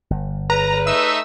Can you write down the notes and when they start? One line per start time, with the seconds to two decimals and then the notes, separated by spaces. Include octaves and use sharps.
0.10 G1
0.50 B4 A#5
0.87 A3 D#4 E5 E6